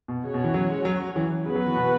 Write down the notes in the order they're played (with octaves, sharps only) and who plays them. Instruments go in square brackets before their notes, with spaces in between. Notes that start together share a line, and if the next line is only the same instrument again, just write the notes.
[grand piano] B2
[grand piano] C#3 [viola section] C#4 F#4 C#5
[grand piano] B2
E3
F#3
G#3
F#3
E3
[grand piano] C#3 [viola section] B3 F#4 B4
[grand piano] F#3
E3
B2